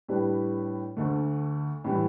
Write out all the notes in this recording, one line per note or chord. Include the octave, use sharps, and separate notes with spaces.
A2 G3 D4 G4 B4
D2 D3 A3
A2 E3 G3